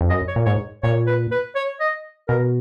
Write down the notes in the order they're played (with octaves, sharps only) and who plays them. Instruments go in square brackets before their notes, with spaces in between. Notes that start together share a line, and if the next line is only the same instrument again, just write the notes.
[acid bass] F2
[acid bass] F#2 [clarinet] D#5
[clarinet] C#5
[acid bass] A#2
[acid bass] G#2 [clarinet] C#5
[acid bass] A#2 [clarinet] C#5
[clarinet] B4
B4
C#5
D#5
[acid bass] B2 [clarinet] A#4